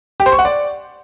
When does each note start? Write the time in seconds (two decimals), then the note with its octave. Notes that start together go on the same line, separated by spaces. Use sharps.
0.20 G4
0.26 C5
0.32 C#6
0.39 F#5
0.45 D5